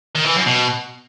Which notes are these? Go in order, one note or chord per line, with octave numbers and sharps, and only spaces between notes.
D#3
E3
F#2
B2